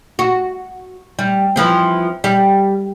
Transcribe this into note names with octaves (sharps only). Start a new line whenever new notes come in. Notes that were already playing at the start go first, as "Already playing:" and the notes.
F#4
G3
E3 F3 C4
G3